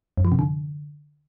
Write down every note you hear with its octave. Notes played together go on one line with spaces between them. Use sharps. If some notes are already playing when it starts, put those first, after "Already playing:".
F#2
F3
C3
D3